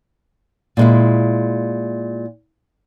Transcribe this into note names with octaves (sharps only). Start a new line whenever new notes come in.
A#2 G#3 E4